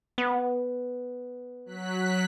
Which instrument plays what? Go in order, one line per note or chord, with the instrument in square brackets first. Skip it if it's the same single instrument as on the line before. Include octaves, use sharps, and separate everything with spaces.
[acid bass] B3
[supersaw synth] F#3 F#6 B6